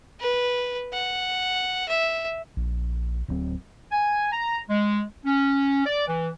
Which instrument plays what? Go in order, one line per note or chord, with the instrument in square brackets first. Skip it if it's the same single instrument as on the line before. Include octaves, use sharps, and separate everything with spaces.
[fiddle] B4
F#5
E5
[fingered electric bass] A#1
D1 G2 F#3 C4
[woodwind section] G#5
A#5
G#3
C#4
D5
E3